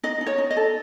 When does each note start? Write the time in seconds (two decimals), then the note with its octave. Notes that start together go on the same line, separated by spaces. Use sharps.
0.03 D#4 D#5
0.21 D#4
0.26 C#5
0.38 D#4
0.51 D#5
0.57 A4